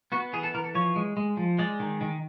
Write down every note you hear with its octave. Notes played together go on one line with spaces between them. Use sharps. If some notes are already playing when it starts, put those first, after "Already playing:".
B3 F#4
E3 G#4
A4
E3 A#4
A4
F3 C#5
G#3
G#3
F3
G#3 D5
D#3
D#3